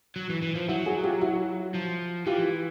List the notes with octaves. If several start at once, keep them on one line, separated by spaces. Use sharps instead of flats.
F#3
E3
E3
F3
F#3 E4 F#4
F#4 G#4
F4 G4
E4 F#4
F3
E3 F4 G4